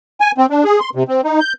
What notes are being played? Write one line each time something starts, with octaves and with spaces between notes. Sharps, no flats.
G#5
C4
D4
G#4
C6
C3
C4
D#4
G6